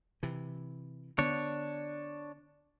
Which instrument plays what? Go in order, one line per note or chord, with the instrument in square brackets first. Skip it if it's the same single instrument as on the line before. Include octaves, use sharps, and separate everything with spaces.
[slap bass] C3 E3
[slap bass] D3 B3 [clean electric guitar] D4 C#5